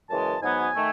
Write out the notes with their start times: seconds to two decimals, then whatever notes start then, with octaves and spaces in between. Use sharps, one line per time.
0.09 F#2 C#3 E3 G#3 A5
0.43 G#2 F#3 B3 G#5
0.76 D#3 A3